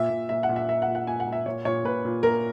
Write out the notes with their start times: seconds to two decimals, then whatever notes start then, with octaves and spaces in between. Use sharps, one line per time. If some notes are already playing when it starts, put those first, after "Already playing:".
Already playing: A#2 E5
0.10 A#2
0.29 A#2 E5
0.43 F#5
0.49 A#2
0.56 E5
0.68 A#2 E5
0.82 F#5
0.88 A#2
0.95 F#5
1.07 A#2 G#5
1.20 F#5
1.27 A#2
1.32 E5
1.46 A#2 C#5
1.65 A#2 C#5
1.84 A#2 B4
2.05 A#2
2.23 A#2 A#4